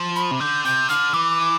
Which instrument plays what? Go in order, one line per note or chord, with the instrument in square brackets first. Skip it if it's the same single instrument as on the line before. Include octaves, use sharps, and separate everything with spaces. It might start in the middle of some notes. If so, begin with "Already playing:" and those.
Already playing: [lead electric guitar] F3
[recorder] B5
[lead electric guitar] C3
[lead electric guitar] D3 [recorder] G6
[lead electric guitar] C3 [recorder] G6
[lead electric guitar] D3 [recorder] F6
[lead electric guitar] E3 [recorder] D6